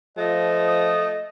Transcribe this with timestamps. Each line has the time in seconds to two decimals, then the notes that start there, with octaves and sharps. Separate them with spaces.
0.17 F3 A3 D#5
0.66 D#6